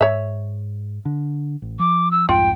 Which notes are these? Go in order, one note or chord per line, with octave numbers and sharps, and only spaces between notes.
G#2 C#5 E5
D3
A1
F3 D6
E6
C2 F2 G#2 F4 G5